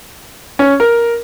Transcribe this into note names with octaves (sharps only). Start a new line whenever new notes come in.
C#4
A#4